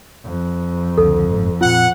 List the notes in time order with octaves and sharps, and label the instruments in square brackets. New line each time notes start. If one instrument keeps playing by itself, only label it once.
[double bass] F2
[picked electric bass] C#2 D3 [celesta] A4
[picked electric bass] F#1 G#2
[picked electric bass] A#2 C4 [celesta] F4 [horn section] F#5